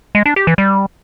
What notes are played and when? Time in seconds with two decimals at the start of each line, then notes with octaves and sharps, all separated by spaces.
0.15 G#3
0.26 D4
0.36 G4
0.47 E3
0.58 G3